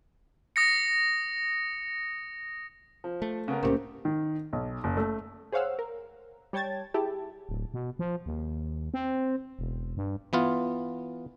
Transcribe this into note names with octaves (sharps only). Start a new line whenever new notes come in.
D#6 A#6 C#7
F3
A3
C#3 B3 A#4
C2 A2 C3 A#3 C4 C#4 G4 A#4
D#3
B1
F#1
A3
G#4 C5 C#5 F5 F#5 E6
A#4
G3 C#5 G5 A5 G#6 A6
E4 G4 G#4 A5
D1
B2
F3
D#2
C4
E1
G2
E3 B3 F4